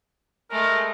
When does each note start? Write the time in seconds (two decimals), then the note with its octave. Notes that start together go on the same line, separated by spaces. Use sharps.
0.51 G#3 A3 A#4